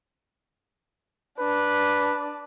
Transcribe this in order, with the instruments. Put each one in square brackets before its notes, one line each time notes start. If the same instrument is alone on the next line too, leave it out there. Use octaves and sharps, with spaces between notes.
[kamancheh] D4 [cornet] B4